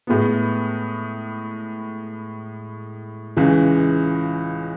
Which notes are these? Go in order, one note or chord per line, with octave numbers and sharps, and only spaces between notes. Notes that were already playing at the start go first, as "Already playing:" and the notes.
A2 G#3 B3
C#2 C#3 E3 G#3